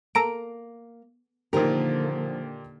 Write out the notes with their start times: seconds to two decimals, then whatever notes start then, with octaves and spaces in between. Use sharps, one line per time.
0.15 A#3 A4 A#5 D7
1.53 A#2 D3 D#3 F3 A#3 G4 A#4